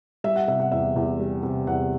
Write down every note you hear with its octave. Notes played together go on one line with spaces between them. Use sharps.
G3 E5
F#5
C3 E5
F#5
E2 E5
E2
G3
C3
E2 F#5